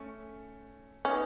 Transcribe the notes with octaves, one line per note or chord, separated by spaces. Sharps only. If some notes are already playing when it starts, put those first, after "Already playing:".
Already playing: A3 C#4
B3 C#4 D#4